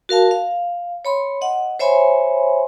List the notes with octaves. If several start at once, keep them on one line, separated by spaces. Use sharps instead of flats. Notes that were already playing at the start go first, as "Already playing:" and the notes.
F#4 A#4 F5 A5
F5
C#5 B5 C6
D#5 F#5
C5 C#5 E5 G#5 B5 C6